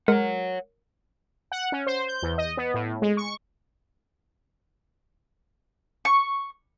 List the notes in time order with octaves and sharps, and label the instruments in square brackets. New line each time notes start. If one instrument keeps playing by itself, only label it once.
[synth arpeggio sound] G#3 [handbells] A#4 [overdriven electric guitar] C#5 F#5
[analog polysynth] F#5
C#4
C5
G6
E2
D#5
B3
A2
G#3
C#6
[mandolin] C#6